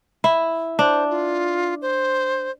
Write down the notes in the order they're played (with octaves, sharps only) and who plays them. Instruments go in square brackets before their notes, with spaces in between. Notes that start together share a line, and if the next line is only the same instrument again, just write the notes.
[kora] E4
[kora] D4 [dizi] C5
[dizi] F4
C5